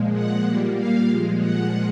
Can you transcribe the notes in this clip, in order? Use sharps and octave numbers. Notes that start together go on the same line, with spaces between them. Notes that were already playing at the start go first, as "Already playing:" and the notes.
Already playing: A#2 F3 G#3
F#5
A#2 G3 A#3
F5
A#2 F3 G#3
F#5